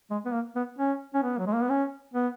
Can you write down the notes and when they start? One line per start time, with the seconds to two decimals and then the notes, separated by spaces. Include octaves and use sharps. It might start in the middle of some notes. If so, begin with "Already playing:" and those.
0.11 G#3
0.26 B3
0.33 A#3
0.56 B3
0.79 C#4
1.14 C#4
1.23 B3
1.38 F#3
1.47 G#3
1.54 A#3
1.61 B3
1.70 C#4
2.14 B3